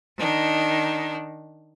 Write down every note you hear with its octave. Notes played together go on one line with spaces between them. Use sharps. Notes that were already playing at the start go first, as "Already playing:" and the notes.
D#3 D4 D#4